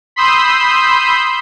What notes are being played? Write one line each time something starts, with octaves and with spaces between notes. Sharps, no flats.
B5 C6 D#6 E6 G6